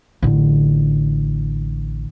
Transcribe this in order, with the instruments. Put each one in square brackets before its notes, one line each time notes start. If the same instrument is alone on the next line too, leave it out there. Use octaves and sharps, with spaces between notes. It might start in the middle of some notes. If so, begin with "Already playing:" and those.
[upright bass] A1 D3